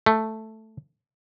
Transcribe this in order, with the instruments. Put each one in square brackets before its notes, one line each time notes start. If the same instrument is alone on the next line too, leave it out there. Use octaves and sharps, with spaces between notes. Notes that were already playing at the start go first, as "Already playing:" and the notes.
[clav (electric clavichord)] A3